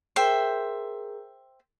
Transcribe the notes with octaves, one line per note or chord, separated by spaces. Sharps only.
G#4 A#4 C5 E5 G5